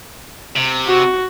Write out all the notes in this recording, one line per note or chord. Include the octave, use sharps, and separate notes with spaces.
C3
F#4